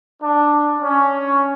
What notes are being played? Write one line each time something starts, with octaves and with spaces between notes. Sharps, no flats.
D4
C#4